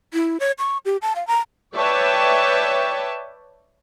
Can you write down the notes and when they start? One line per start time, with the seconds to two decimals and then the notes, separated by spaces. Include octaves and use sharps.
0.14 E4
0.40 C#5
0.59 C#6
0.85 G4
1.02 A5
1.16 F5
1.27 A#5
1.74 B4 C#5 D5 E5 G5 A5